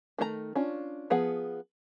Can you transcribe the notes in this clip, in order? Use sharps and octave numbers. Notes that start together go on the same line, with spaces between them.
D#3 A3 F#4 A#5
C#4 D4 F4
F3 B3 G#4 F#5